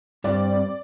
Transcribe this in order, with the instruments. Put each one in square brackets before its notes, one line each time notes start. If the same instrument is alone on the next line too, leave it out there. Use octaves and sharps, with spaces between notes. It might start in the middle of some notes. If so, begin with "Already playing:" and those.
[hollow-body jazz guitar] G2 [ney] C4 [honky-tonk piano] D5